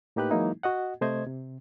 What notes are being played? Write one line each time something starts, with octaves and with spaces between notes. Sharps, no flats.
A2 A#3 D#4 G4 B4 F#6
E3 F#3 G#3 A#3 D#4 E4
F#4 D#5 F#5
C3 A3 C5 D#5 G#6
C3